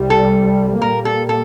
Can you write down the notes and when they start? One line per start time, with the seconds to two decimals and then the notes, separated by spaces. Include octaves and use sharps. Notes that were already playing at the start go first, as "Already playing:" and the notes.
Already playing: C2 C3 G3
0.10 A4
0.81 A#2 G3 A#3 A#4
1.05 A4
1.29 A4